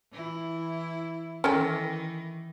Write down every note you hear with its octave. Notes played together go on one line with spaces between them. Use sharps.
E3 E4
D#3 E3 C#4 A4 G5